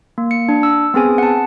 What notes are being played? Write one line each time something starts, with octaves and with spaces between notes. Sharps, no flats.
A#3
C#7
D4
E6
B3 C4 G#4 G#5
F#5 A5